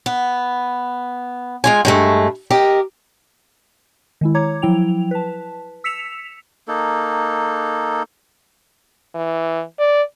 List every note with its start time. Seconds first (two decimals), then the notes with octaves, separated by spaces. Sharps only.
0.06 B3
1.64 G#3 F4 G#5
1.85 G2 G#3 A3
2.51 G4 A#4 D#5
4.21 D#3 G#3 E4
4.34 C#5 A#5 D6 G#6
4.62 F3 F#3 E4 G5 F7
5.11 B4 A5
5.84 E6 B6 C#7 E7 F7
6.68 A#3 D#4 A4
9.15 E3
9.79 D5